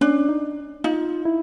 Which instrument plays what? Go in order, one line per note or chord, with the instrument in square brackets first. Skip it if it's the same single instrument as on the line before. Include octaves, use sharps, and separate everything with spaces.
[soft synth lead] C#4 [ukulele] D4
[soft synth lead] D#4
[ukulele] D#4 [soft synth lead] F4
[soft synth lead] E4